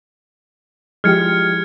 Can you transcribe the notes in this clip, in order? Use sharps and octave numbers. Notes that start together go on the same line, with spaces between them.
F3 G#3 E4 G4 F6 G#6 C#7